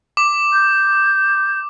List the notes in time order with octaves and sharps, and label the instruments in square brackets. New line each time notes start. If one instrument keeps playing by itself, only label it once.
[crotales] D6
[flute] G6